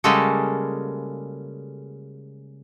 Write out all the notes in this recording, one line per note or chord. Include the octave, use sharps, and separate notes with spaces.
C#3 G3 G#3 A#3 F#4 A4